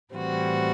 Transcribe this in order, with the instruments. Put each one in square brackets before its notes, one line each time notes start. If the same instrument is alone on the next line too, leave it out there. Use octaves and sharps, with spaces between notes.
[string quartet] A2 E3 G3 C4 F#4